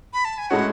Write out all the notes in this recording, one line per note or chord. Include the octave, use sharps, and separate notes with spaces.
B5
A5
G#5
A2 G#3 C#4 F#4 F#5